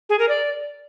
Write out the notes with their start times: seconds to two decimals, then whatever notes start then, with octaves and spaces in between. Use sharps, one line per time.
0.09 G#4
0.19 A#4
0.29 D5